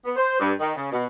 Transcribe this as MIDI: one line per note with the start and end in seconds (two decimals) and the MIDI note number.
0.05 0.13 59
0.16 0.36 72
0.40 0.53 43
0.60 0.74 51
0.76 0.89 49
0.92 1.05 47